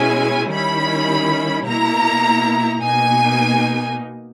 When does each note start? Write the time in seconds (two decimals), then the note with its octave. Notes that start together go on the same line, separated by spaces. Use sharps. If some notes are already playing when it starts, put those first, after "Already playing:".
Already playing: B2 G#3 C#4 E4 G#5
0.51 D#3 G3 C#4 E4 B5
1.66 B2 A#3 E4 A#5
2.82 B2 A#3 D#4 G#5